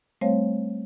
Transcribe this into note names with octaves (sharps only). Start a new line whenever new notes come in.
G3 A3 C4 C5 C#5 F5